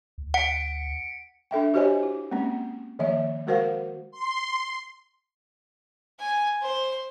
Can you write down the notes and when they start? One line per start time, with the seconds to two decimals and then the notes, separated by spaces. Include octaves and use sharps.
0.18 D2
0.34 F#5 B6 C#7 D7
1.51 D4 A4 E5 G5
1.74 F#4 G4 C5 C#5 D#5 G#5
2.03 E4
2.31 G#3 A#3 C4 C#4
2.99 D#3 F3 A#3 C#5 E5
3.47 G#3 F#4 A#4 C5 F5 F#5
4.11 C6
6.19 G#5
6.62 C5 C6